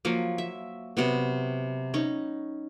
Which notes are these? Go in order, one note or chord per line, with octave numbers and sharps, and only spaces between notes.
F3 F#3 A#3
E5
C3 F#3 B3
C#4 D#4